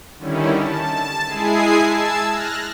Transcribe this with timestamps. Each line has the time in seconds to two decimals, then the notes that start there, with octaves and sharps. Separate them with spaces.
0.18 D3 D#3 G3 C#4 E4
0.55 A5
1.26 G#3 E4 G#4 G#5 C7
1.82 A5 E6 G#6
2.29 F6 F#6 A#6